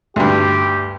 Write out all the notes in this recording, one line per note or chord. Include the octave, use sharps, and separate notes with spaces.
D2 G2 G4